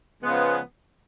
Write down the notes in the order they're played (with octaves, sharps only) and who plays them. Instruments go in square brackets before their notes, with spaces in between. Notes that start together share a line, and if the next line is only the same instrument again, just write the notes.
[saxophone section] C#3 F3 G#3 B3